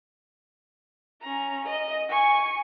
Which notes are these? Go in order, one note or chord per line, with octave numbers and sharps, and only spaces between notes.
C#4 A#5
D#5
G#5 C#6